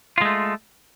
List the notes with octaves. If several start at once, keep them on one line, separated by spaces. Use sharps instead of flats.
G#3 A3 F4